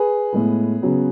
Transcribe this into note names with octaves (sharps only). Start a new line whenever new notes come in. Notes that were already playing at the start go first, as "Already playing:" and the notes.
Already playing: G#4 B4
A2 G#3 B3
C#3 F#3 B3